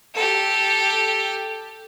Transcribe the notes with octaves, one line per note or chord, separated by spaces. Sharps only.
G4 A4